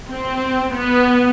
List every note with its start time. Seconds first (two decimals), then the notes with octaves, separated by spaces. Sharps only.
0.12 C4
0.75 B3